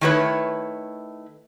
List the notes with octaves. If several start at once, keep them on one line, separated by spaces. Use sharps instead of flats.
D#3 A3 E4 A#4 B4 C#5